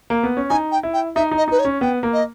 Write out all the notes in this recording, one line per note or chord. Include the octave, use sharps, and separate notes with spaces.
A#3
B3
C#4
D#4 G#5
G5
E4
G5
D#4 E5
D#4
D#5
D#4 B4
C#5
C#4
B3 G5
A#3
D#5